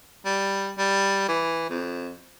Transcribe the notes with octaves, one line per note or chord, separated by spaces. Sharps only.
G3
G3
E3
F2